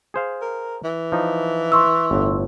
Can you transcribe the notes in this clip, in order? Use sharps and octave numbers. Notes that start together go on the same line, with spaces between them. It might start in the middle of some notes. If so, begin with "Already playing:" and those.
G#4 C5 F5
A#4
E3
F3 D#4
C6 C#6 E6
G1 A2